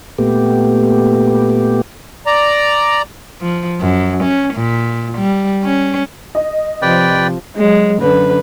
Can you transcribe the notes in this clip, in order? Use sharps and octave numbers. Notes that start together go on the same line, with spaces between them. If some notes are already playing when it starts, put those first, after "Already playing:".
A#2 A3 B3 G4
D5 A#5
F3
F#2
C#4
A#2
G3
C#4
D#5
C3 F3 B4 D5 G5
F#3 G#3
F#2 D3 B4